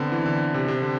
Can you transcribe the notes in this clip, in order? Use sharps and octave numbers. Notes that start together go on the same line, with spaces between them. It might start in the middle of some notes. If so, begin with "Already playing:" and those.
Already playing: D3 B3 C4
E3
D3
C3
C3
D3